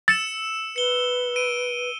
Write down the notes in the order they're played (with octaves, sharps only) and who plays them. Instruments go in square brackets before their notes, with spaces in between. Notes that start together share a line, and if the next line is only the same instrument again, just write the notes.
[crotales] E6 C#7 E7 [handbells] A6
[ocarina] B4 [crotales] C#7 G7
[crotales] D7 D#7